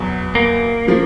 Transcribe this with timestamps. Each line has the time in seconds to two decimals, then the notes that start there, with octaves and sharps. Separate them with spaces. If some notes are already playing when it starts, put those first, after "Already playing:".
Already playing: E2 B2 F#3 B3
0.35 A#3
0.87 C#3 F3